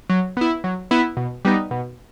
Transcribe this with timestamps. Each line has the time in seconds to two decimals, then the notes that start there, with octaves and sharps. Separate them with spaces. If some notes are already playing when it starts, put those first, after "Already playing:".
0.10 F#3
0.37 B3 E4
0.64 F#3
0.91 B3 E4
1.17 B2
1.45 G3 B3 D#4
1.71 B2